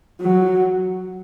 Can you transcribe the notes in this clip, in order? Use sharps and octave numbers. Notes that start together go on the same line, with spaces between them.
F#3